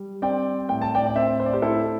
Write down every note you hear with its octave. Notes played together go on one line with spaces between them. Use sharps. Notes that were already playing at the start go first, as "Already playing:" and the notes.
Already playing: G3
C4 D5 G5
A2 G5
A5
D5 G5
D5
C4 C5 E5
C5
D5
G4 C5
A3 E4 A4